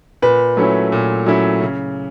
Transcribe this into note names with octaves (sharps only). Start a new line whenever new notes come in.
A#2 B4
F#3 A3 C#4 E4
A#2
F#3 A3 C#4 E4
C#3